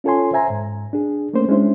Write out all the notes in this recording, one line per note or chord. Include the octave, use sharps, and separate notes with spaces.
C#4 F4 A4 C#5 G#5 C6
C5 E5 G#5 A#5
G#2
D4 G#4
A3 A#3 C#4 C5
G#3 C#4 D4 E4 C5